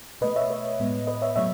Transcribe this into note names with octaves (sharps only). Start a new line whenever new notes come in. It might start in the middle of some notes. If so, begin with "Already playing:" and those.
B2 A3 B4 D#5
C#5 E5
B4 D#5
A2 G#3 B3
B4 D#5
C#5 E5
B2 F#3 A3 C#5 E5